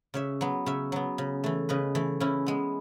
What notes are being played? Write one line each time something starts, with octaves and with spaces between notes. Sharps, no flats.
C#3 C#5 E5
F#3 B3
C#3 C#5 E5
F#3 B3
C#3
E3 A3
C#3 B4 D#5
E3 A3
C#3 C#4 E4
G#3 B3